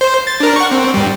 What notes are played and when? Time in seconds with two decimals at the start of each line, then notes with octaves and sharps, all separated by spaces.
0.01 C5
0.27 A6
0.40 D4 A#4
0.56 F#5 C#6
0.71 C4
0.94 G2 G3